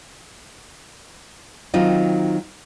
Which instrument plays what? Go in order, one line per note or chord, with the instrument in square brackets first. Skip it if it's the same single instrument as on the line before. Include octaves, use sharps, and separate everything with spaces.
[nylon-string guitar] D#3 F#3 C4 D#4 F4